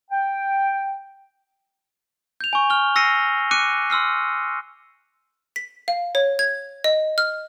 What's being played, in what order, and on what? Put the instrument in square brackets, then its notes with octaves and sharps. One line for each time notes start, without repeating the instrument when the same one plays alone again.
[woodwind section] G5
[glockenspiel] G6 F7
G#5 C#6
F6 G7
E6 A#6 C7 C#7 D#7
D6 F#6 C#7 D#7
C6 E6 F6 C7
[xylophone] B6
F5
C#5
G#6
D#5
F6